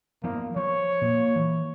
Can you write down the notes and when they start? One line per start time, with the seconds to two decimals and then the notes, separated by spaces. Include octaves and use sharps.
0.24 F3 A#3 B3
0.56 F3 C#5
1.01 A#2
1.36 E3